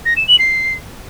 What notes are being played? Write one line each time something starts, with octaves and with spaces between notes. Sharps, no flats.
A#6
E7
F#7
C7